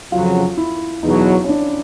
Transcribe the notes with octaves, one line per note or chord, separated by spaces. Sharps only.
F2 C#3 F#3 F4
E4
E2 B2 F#3 D#4
C#4
D4